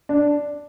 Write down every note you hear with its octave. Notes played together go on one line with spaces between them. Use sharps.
D4